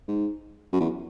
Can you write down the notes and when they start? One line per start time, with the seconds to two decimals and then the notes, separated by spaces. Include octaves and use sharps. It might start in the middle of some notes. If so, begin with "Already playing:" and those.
0.08 G#2
0.73 F#2
0.80 E2